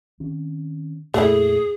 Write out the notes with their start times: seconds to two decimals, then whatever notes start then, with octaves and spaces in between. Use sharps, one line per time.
0.20 D#3 C4 C#4
1.14 F2 A#2 A3 E4 G#4